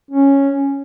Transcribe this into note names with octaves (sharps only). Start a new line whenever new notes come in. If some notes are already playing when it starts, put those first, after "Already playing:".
C#4